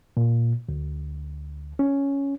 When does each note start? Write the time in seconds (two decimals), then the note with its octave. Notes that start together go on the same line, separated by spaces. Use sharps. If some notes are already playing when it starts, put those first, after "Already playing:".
0.17 A#2
0.69 D2
1.79 C#4